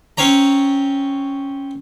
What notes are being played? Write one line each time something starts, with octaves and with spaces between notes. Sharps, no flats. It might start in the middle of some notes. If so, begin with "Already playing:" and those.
C4 C#4 C#5 A#5